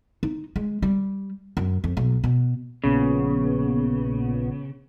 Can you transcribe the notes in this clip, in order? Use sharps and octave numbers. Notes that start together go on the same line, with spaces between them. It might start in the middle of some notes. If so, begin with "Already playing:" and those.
D#4
G#3
G3
F#2
F2
B1
B2
A#1 A#2 C#3 B3